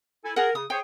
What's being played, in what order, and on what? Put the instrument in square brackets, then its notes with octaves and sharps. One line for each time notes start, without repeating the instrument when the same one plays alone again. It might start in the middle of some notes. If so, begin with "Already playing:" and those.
[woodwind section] E4 A4 G#5
[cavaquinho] G#4 F#5 [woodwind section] A#4
[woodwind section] C#3 [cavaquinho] D#6
[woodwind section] G#4 C5 C#5 [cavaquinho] G5